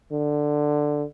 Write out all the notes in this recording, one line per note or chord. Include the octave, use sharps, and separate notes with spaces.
D3